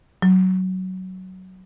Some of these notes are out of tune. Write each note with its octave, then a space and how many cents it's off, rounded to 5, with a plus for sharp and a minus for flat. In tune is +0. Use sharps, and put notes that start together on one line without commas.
F#3 +10